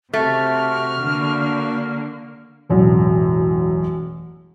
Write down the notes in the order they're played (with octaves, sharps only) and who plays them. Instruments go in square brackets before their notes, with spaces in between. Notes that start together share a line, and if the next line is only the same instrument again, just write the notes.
[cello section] C3 [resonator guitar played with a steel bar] A3 [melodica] F#4 [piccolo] F6
[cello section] D3 A#3
[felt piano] E1 A1 F#2